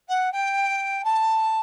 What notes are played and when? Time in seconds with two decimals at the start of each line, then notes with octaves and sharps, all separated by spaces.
0.08 F#5
0.32 G5
1.04 A5